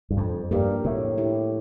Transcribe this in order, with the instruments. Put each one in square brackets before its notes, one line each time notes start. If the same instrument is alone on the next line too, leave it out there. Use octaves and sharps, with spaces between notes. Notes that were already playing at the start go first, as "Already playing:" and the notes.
[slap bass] G2
[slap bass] F2 [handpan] F3
[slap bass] G2 [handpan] A#3 D4 G4 A#4
[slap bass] A2 [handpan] A3
[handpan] E4 G4